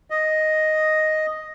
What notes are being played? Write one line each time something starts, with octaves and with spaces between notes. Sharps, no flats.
D#5